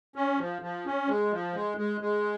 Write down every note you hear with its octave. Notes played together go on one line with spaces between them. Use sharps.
C#4
F3
F3
C#4
G#3
F3
G#3
G#3
G#3